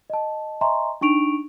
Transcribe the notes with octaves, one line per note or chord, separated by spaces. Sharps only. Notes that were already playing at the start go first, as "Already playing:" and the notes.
D#5 A5
D#5 E5 G#5 A#5 C6 C#6
D4 D#4 C#6 D7 F7